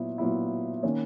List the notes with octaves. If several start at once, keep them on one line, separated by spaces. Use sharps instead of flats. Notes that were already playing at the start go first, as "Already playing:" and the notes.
Already playing: A#2 F#3 B3 E4
A#2 F#3 B3 E4
D#3 A#3 C#4